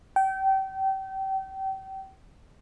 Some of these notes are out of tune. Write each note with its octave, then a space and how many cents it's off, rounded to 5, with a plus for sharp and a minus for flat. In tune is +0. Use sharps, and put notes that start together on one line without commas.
G5 -30